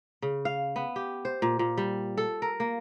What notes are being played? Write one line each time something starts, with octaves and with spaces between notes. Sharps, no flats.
C#3
F5
B3
G4
C5
A#2
A#2
G3
A4
A#4
A#3